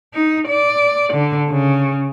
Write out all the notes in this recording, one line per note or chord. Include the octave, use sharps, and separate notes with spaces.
D#4
D5
D3
C#3